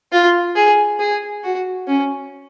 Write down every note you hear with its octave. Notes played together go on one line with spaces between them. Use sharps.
F4
G#4
G#4
F#4
C#4